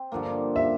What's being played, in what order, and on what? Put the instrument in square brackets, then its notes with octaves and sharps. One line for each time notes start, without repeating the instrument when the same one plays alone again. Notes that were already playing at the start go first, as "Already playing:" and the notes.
Already playing: [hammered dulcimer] C4
G2 D3 F3 A#3
[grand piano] E5